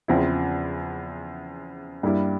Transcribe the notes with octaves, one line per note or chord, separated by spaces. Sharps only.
E2 C#3 F3 C4 E4
G2 G3 A#3 E4